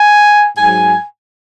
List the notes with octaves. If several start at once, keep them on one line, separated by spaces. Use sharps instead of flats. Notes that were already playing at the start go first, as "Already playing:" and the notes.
Already playing: G#5
G#2 F#3 G#5